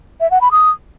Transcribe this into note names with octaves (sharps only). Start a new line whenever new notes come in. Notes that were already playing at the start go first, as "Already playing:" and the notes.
E5
F#5
B5
D#6